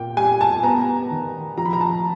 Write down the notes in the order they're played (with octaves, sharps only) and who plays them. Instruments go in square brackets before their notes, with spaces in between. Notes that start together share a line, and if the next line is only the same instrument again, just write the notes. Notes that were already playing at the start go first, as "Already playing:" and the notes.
Already playing: [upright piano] A#2 G5
G3 G#5
A5
B3 A#5
D#3
F3 A#5
B5
A#5
A5